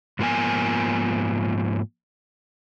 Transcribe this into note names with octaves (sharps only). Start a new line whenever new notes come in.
G#2 F3 A#3 B3 G#5